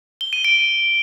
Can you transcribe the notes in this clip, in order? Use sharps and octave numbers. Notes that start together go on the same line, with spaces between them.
G7
D#7
D7